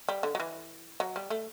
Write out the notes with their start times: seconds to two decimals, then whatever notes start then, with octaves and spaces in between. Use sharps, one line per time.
0.09 G3
0.23 D3
0.35 F#3
0.40 E3
1.00 F#3
1.16 G3
1.30 A3